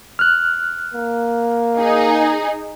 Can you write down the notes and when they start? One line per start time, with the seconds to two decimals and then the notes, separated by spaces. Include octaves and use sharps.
0.19 F6 F#6
0.94 A#3
1.77 D#4 G#4